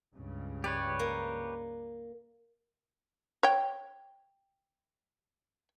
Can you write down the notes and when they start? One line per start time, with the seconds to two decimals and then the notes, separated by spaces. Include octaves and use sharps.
0.14 C#2 G2 C#3
0.64 G4 B4 C#5 D5
0.99 A#3
3.43 C#5 G5